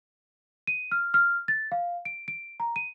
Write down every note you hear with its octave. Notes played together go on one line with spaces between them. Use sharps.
D#7
F6
F6
A6
F5
D7
D7
A#5
D#7